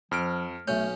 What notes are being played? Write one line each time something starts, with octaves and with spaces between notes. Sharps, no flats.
F2 F3 F6 D7
B1 A3 C#4 G6